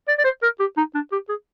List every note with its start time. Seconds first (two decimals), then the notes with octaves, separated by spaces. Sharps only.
0.08 D5
0.18 D5
0.24 C5
0.42 A#4
0.60 G4
0.77 D#4
0.95 D4
1.12 G4
1.29 G#4